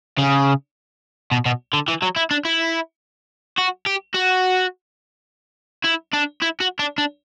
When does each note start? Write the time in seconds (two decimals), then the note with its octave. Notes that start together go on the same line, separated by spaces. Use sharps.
0.18 C#3
1.32 B2
1.46 B2
1.73 D3
1.88 E3
2.02 F#3
2.16 E4
2.31 D4
2.45 E4
3.58 F#4
3.86 G4
4.15 F#4
5.85 E4
6.13 D4
6.42 E4
6.60 F#4
6.79 D4
6.98 D4